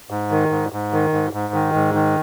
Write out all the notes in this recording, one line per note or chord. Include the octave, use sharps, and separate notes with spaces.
G#2
D#3
G#2
G#2
D#3
G#2
G#2
D#3
G#2
D#3